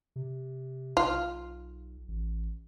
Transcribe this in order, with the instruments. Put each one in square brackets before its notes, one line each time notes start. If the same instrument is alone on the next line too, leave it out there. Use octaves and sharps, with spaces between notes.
[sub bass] C3
[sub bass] B1 [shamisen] F4
[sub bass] A1